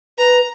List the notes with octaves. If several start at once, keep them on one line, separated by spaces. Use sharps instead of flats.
B4 A#5